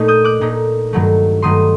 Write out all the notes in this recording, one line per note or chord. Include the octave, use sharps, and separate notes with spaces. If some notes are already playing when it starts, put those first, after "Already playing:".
Already playing: A#2 A3 D#4
D#6 G6
D6 F#6
A#2 A3 D#4
G2 D#3 F#3 A3
G2 D#3 F#3 A3 C6 D#6